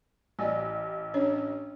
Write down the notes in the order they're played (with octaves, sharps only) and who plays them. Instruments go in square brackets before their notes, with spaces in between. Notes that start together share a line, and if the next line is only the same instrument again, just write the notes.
[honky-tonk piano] A1 [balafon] D5 G#5
[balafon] C#4 D4 C#5